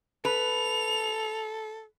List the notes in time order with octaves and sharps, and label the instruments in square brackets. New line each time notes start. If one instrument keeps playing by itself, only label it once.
[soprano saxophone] A4 [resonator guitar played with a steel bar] B4 [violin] F7